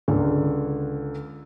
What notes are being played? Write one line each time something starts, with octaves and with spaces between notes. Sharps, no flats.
C#2 D3